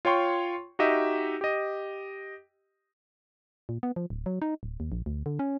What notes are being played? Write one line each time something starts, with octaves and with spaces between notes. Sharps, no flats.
F4 C#5 G5 C6 C#6
D#4 F#4 G4 D#5 E5
G4 D#5
A#2
B3
F3
D1
F#3
D#4
D1
D#2
A#1
D2
D3
C#4